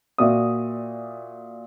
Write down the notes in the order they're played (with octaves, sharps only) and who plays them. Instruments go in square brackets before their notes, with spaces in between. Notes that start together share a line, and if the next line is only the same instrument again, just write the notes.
[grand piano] A#2 F#4 D5 E5 D#6